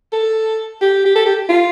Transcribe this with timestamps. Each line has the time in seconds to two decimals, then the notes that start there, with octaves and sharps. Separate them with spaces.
0.13 A4
0.82 G4
1.05 G4
1.16 A4
1.26 G4
1.49 F4